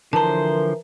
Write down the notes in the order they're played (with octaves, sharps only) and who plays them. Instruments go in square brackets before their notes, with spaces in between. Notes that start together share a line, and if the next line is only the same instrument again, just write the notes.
[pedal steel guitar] D3 F3 C5 [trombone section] E3 A#4 [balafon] A5 A#5